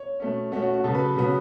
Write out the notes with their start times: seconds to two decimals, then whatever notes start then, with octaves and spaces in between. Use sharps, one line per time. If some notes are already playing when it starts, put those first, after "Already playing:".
Already playing: C#5
0.20 B2 A3 C#4
0.52 B2 A3 C#4 F#4
0.62 F#4
0.74 F#4
0.84 C#3 F#3 B3 A4
0.95 B4
1.16 C#3 F#3 B3